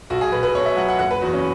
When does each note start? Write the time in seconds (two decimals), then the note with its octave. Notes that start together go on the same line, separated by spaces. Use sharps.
0.10 B1 F#4
0.21 G#4
0.32 B2 B4
0.43 B4
0.55 B1 C#5
0.66 E5
0.76 F#3 F#5
0.89 F#5
0.99 F#1 F#5
1.11 B4
1.21 E2 F#4
1.33 C#4